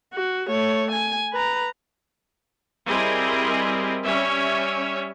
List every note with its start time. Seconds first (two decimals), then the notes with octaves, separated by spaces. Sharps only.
0.14 F#4
0.48 A3 C#5
0.91 G#5
1.33 B4 A#5
2.88 G3 C4 E4 G#4 A#4 D#5
4.05 G3 C#4 C#5 E5